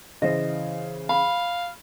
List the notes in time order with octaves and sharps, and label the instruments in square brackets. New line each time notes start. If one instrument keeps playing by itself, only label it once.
[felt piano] C#3 E3 C5 [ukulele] D#5
[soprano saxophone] F5 [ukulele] B5